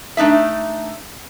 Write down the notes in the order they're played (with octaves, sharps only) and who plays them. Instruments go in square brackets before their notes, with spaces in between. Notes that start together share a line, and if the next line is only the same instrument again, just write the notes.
[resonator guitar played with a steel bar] A3 D4 D#4 E5